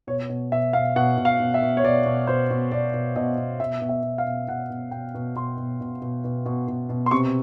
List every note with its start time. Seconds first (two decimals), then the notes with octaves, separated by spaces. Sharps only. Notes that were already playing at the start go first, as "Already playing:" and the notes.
0.07 B2 C#5
0.29 B2
0.52 B2 E5
0.73 B2 F5
0.96 B2 F#5
1.17 B2
1.25 F5
1.40 B2
1.54 E5
1.62 B2
1.77 C#5
1.84 B2 D5
2.06 B2
2.27 B2 C5
2.51 B2
2.72 B2 D5
2.94 B2
3.16 B2 D#5
3.37 B2
3.60 B2 E5
3.81 B2
3.89 E5
4.03 B2
4.18 F5
4.26 B2
4.48 B2 F#5
4.70 B2
4.91 B2 G5
5.15 B2
5.35 B2 C6
5.57 B2
5.80 B2
6.02 B2
6.24 B2
6.46 B2
6.68 B2
6.89 B2
7.06 C6
7.11 C3 C#6